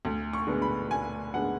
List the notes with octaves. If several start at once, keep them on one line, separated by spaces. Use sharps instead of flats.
D2
C#6
D3 G#3 B3 D4
B5
D2 G#5
D3 G#3 B3 D4 F#5